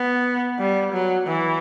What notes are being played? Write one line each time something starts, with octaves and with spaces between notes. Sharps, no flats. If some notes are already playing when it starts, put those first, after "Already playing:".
Already playing: B3
G3
F#3
E3